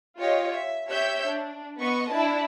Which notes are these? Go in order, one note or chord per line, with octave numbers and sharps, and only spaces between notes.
F4 G4 C#5 D#5
E5
G4 C#5 E5 E6 G6
D4
B3 B4 D#5 C#6
D4 E4 A5